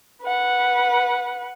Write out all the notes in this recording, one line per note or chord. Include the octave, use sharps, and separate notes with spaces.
B4 F#5